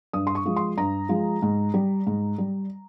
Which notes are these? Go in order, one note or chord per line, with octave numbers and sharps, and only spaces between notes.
G2 D#6
C6
C#6
F3 G#3
C6
G2 A#5
F3 G#3
G#2
G3
G#2
G3